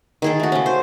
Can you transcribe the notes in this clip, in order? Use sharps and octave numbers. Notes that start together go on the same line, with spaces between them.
D#3 G#4 A4
A3 F#4
C#3 C#4
C5